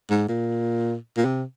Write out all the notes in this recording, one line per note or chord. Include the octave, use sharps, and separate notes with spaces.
G#2
A#2
A#2
C3